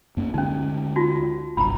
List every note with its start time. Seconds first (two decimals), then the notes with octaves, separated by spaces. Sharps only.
0.17 F#2 A#3 C#4
0.34 D2 D3 G#3 C#4 D#4
0.96 D#4 F4 F#4
1.57 F#1 B1 G2 A#5 B5